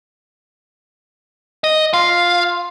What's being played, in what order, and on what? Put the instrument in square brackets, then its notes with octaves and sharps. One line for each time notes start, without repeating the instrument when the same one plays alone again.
[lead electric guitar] D#5
[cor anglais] F4 [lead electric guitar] F5